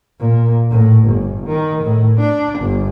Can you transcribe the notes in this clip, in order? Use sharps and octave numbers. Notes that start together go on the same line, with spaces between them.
A#2
A2
G1
D#3
A2
D4
G1